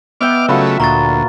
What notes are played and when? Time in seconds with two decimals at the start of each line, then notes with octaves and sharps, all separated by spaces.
0.21 B3 D#5 E5 G5 D6 F6
0.49 C#3 F#3 A3 F4 F#4 B4
0.65 E5
0.80 D2 A#2 A#5 C#6 A6